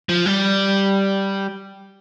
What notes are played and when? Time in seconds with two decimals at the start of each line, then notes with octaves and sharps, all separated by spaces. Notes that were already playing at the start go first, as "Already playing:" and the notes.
0.09 F3
0.26 G3